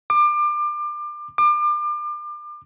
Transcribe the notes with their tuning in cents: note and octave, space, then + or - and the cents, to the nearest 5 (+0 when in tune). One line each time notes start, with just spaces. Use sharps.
D6 +30
D6 +35